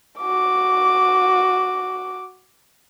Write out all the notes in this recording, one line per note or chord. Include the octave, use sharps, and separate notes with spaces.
F#4 D6